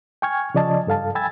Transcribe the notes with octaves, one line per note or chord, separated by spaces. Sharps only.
G5 G#5 C#6 F6 G#6
C#3 F3 D5 D#5 A5
G2 A4 F5 A5
G5 G#5 B5 E6 G#6 A6